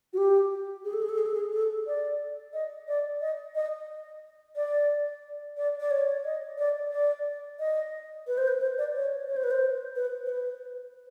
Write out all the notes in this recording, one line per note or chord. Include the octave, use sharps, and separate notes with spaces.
F#4
G4
G#4
A4
G#4
A4
G#4
A4
G#4
A4
D5
D#5
D5
D#5
D#5
D5
D5
D5
C#5
D#5
D5
D5
D#5
B4
C5
B4
C5
D5
C#5
C#5
C5
B4
C5
B4
C5
B4